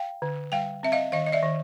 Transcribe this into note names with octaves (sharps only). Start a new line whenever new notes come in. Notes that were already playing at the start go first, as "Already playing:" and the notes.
Already playing: F5 G5
D3
G3 F5 G5
C4 E5
D#5 F5
D#3 D#5 F5
D#5
D5 E5
D#3